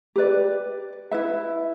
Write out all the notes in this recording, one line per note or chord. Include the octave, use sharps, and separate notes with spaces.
G4 B4 D5
E4 B4 E5